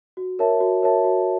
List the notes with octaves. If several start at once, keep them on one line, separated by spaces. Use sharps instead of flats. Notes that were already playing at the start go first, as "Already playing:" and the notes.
F#4
A#4 C#5 E5 A5
F#4
A#4 C#5 E5 A5
F#4